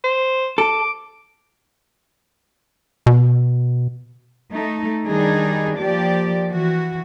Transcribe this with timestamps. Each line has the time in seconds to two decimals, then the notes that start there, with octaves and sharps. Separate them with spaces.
0.04 C5
0.58 A4 D6
3.06 B2
4.54 A3 D#4
5.06 D#3 G3 D4 D#4 G#4
5.80 F3 A#3 G4 D5
6.51 E3 F#4